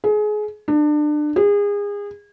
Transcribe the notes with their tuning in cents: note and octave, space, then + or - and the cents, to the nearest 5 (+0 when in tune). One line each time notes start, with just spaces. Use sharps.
G#4 +25
D4 +30
G#4 -30